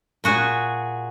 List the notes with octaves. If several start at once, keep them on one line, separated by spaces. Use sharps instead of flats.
A#2 F#4 G#4